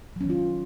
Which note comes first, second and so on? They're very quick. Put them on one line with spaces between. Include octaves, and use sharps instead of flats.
F#3 C#4 D#3 F4